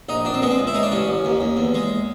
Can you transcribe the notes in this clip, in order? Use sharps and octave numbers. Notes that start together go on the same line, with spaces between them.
A#1 D#4
A#1 D4
C4
G#3 B3
C4
C#2
E4
G#3 D#4
D4
A1 C#4
A1
D#2
D#2
E2
G#3